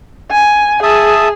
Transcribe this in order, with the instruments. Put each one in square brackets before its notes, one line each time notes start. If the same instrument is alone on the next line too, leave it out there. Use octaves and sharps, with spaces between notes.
[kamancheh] G#5
[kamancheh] G#4 [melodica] E5 A5 D#6